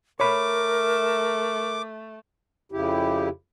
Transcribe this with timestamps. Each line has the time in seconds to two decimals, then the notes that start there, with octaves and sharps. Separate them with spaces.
0.20 A3 A#4 C#5 B5 D6
2.72 F2 C#3 E4 G4